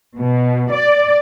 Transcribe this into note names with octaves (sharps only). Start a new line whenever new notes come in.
B2
D5